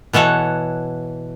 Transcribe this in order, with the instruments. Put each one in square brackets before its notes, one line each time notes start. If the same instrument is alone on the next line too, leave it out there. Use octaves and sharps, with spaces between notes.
[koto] B2 E3 A4 C#5 F#5